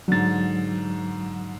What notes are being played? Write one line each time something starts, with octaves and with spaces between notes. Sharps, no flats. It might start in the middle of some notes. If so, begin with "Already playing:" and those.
G#2 D3 F#3 A6